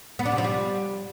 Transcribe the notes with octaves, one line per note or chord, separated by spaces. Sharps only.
B3
D4
C3
F3
G3